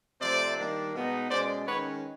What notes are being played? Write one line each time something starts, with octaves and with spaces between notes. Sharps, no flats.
C3 F3 A3 C4 C5 D5
D#3 G3 A#3 D4
B2 G#3 B3 D#4
B2 G#3 C#4 C5 D5
D#3 G#3 C#4 B4 C#5